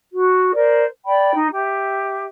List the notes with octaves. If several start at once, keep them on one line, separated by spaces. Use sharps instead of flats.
F#4
A#4 C5 D5
D5 G5 B5
D#4
G4 E5